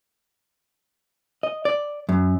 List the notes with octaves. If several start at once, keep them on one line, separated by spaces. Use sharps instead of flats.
D#5
D5
F#2